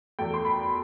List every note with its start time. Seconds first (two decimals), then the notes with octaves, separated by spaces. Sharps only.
0.19 E2 B2 A3 G5
0.34 C6
0.45 B5